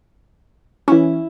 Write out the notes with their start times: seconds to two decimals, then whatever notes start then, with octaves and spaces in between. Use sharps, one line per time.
0.88 E3 C#4 E4